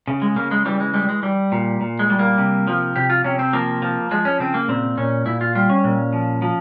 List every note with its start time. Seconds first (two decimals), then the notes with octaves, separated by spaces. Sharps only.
0.07 C#3
0.22 G#3
0.36 C#3 A#3
0.51 G#3
0.65 E3 G3
0.80 G#3
0.94 G3 G#3
1.09 G#3
1.23 G3
1.52 A#2
1.81 A#2
1.99 G#3
2.10 G3
2.19 A#3
2.38 C3
2.67 F3
2.96 C3 G4
3.10 F4
3.24 C3 C#4
3.39 C4
3.53 F3 A#3
3.82 F3
4.11 F3 G#3
4.25 C#4
4.39 C#3 C4
4.54 A#3
4.68 A#2 C4
4.97 A#2 C#4
5.26 A#2 E4
5.41 F4
5.55 G3 F4
5.69 C#4
5.84 A#2
6.13 F3
6.42 F3